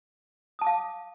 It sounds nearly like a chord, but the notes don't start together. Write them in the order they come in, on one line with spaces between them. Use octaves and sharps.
D#6 A5 D6 F5